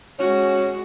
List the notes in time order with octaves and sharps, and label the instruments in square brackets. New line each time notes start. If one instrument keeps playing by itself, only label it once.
[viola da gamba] G#3 F#4 [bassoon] C#4